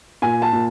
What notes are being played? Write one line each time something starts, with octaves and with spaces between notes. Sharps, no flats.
A#2 G#5
A5
A#2